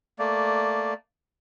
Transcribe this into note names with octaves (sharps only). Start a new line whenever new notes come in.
A3 A#3 D5